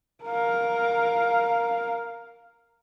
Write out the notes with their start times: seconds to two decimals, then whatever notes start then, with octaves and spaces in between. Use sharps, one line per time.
0.24 A#4 F5